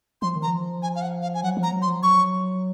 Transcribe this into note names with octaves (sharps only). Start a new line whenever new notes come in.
F3 C6
D#3
A#5
F3
G#5
F5
F#5
F5
G#5
F#3 F#5
F3
A#5
F#3
C6
F3
F#3 C#6